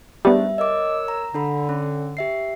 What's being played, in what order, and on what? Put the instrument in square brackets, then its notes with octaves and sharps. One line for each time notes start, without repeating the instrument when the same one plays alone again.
[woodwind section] G#2 A3 D4 [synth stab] G3 B3 [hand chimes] E5
[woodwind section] A#4 C#5 E6 [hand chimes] D#5 D6
[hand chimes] A#5
[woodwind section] D3 [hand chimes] D4 A4 B5
[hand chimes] C#4
G4 E5 C7